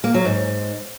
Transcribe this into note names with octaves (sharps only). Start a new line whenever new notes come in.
A#3
F#3
G#2